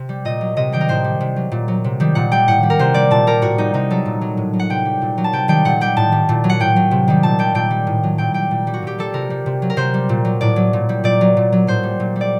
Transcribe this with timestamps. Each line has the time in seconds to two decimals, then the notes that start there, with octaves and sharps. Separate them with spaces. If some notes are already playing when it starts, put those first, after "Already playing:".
Already playing: C3
0.09 G3
0.25 A#2 D#5
0.41 F#3
0.57 C3 D#5
0.72 D#3 G3 G5
0.81 A#4
0.88 A2 C5
1.04 G3
1.21 C3
1.36 F#3
1.51 A#2
1.68 F#3
1.84 C3
2.00 D#3 G3
2.15 A#2 F#5
2.32 G3 G5
2.48 A2 F#5
2.63 G3
2.70 A#4
2.79 C3 C5
2.94 G3 D5
3.11 A#2 A5
3.27 G3 A#4
3.42 A2 F#4
3.58 G3 D#4
3.74 C3 D#4
3.90 F#3 A4
4.05 A#2
4.21 F#3
4.37 A2
4.53 F#3
4.59 F#5
4.70 C3 G5
4.85 G3
5.02 A#2
5.18 F#3
5.24 A5
5.33 C3 G5
5.48 D#3 G3 G5
5.65 A#2 F#5
5.81 G3 G5
5.97 A2 A5
6.12 G3
6.29 A#2
6.44 F#3
6.50 F#5
6.60 A2 G5
6.76 F#3
6.91 C3
7.08 D#3 G3
7.23 A#2 A5
7.39 G3 G5
7.55 A#2 G5
7.70 G3
7.87 A2
8.03 F#3
8.18 A#2 G5
8.34 G3 G5
8.51 A#2
8.67 G3
8.74 F#4
8.83 A#2 G4
8.99 G3 A4
9.14 C3 A#4
9.30 G3
9.46 C3
9.62 F#3
9.70 A#4
9.77 C3 C5
9.94 G3
10.09 A#2
10.25 F#3
10.41 A2 D5
10.56 F#3
10.73 A#2
10.89 G3
11.04 A#2 D5
11.21 F#3
11.37 A#2
11.52 F#3
11.67 A2 C5
11.83 G3
12.00 A#2
12.16 G3
12.21 D5